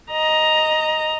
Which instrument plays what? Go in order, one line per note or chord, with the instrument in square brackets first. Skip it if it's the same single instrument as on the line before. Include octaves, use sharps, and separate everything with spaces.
[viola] D#5 A#5